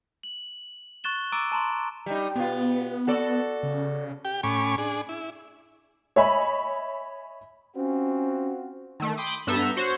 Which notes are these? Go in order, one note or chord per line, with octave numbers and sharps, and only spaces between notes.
F#7
C#6 F#6 A6 E7 G7
A#5 D6 E6 A6 D7 D#7
A5 A#5 C6
G3 D#4
B2 B3 F4
F#4 A4 D5
C#3
G4 G5
A2 C#4 G#5 B5 C#6 D6
D4 G#4
E4
C#5 D#5 E5 G#5 B5
C4 C#4 F4 F#4
D#3 A3
G5 B5 C6 D6 D#6
B5
G2 B3 A4 E5 A#5 G6
F#4 C5 C#5